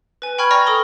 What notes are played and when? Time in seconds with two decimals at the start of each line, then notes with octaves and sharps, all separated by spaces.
0.22 B4 G#5
0.38 G5 B5 C#6 F6 G#6
0.51 D5 A#5 C#6 F6 A#6
0.66 A4 D#6 G7